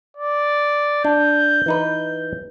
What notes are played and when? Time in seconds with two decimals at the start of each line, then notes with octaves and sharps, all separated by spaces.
0.17 D5
1.05 D4 G6
1.66 E3 D#4 B4